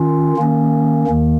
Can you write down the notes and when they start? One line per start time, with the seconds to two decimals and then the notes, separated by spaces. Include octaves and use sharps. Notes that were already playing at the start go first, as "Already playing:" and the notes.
Already playing: D#3 C#4 F4
0.37 D#3 A#3 C#4
1.07 D#2 D#3 A#3